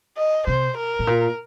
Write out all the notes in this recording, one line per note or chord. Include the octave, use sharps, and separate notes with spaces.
D#5
C3 C5
A#4
A2
A#2